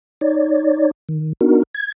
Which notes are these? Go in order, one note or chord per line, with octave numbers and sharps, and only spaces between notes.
D#4 C#5 D5
D#3
B3 D4 D#4 F#4 A#4
G#6